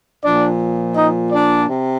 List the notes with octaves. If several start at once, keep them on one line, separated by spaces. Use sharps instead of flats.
A#2 F3 D4 D5
D#4 D#5
D4 D5
C3